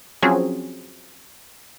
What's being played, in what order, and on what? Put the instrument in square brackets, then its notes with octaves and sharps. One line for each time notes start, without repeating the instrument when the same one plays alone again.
[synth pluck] F3 F#3 C4 C#4 G#4